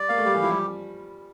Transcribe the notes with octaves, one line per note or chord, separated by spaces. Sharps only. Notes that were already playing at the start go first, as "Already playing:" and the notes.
Already playing: G3 D5
A#3 F5
A3
G3 G4
E3
F3 E4
G3